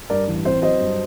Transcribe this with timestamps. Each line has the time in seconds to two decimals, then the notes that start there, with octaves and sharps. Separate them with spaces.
0.10 G2 A#4 D5
0.28 A1
0.45 C4 C5
0.62 F#3 C5 D#5
0.80 G2